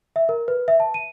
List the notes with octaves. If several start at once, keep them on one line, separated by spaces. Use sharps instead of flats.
E5
A#4
B4
E5
A5
D#7